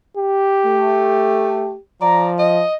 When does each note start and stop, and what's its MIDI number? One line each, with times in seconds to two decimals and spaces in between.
0.17 1.79 67
0.66 1.75 57
2.02 2.64 53
2.02 2.32 74
2.02 2.32 82
2.39 2.74 75